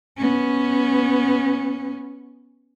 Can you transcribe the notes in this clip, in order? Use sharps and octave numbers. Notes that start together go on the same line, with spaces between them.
B3 C#4